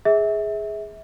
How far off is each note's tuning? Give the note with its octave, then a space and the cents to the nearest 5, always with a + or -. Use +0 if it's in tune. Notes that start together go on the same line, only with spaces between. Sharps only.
G#4 +0 E5 -25